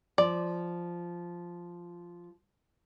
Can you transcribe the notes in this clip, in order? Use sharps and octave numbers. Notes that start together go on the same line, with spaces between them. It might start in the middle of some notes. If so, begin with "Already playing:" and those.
F3 D5